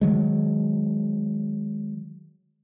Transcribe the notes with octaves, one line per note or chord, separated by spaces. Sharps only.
D#3 F#3 G#3